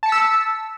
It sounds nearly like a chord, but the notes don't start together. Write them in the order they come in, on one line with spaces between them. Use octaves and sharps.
A5 C#7 B6 E6